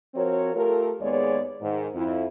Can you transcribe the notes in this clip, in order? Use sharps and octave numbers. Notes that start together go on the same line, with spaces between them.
F3 C4 F#4 A#4 C#5
A3 F4 G4 A4 A#4
D#2 G#3 B3 G#4 C#5 D5
G#2 D#3
F2 E4